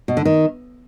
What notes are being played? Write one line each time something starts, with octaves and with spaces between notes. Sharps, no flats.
B2
D3
D#3